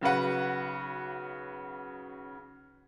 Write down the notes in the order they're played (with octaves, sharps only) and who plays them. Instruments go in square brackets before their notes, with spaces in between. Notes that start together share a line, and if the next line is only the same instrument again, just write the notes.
[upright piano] B1 C#3 F#4 B4 F#5